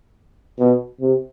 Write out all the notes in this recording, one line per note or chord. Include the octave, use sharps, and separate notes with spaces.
B2
C3